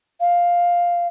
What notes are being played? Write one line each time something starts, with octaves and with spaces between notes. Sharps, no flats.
F5